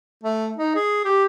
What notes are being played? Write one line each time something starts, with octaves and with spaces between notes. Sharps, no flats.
A3
D#4
G#4
G4